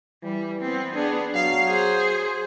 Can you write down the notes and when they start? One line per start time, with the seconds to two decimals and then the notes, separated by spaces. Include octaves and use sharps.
0.23 E3 G3
0.62 B3 C4
0.95 B3 D4 G#4
1.35 F#3 F5
1.67 G#4 C5